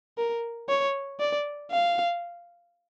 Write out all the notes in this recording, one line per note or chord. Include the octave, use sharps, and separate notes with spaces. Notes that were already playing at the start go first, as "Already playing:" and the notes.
A#4
C#5
D5
F5